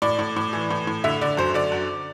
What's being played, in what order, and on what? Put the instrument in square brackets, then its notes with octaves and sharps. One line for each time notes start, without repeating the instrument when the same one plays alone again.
[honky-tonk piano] A2 D5
A2
A2
E3
A2
A2
D3 E5
D3 D5
F#2 C5
D3 D5
F#2